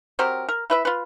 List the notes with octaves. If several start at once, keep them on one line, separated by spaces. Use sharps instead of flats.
F#3 C4 G4 A#4
A#4
E4 B4 E5
F4 B4